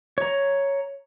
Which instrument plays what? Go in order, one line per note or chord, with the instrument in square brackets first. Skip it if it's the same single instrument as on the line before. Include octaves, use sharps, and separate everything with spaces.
[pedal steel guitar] C#5 A#5